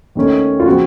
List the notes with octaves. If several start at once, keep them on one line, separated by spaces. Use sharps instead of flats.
D#2 D#3 A3 C#4
F4
C#3 F3 C4 F#4